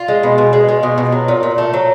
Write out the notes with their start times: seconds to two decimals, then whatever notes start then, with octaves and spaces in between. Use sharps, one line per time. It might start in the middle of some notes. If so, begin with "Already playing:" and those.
Already playing: F4
0.08 G#3
0.23 B2
0.38 B2
0.53 G#3
0.68 G#3
0.83 B2
0.98 B2
1.12 F#3
1.28 A#2
1.43 A#2
1.58 A3
1.74 F#3